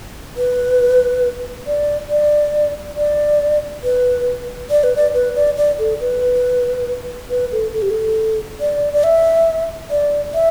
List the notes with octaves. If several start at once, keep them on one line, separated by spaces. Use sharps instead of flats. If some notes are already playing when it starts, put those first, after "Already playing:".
B4
D5
D5
D5
B4
D5
B4
D5
B4
D5
D5
A4
B4
B4
A4
A4
G4
A4
D5
D5
E5
D5
E5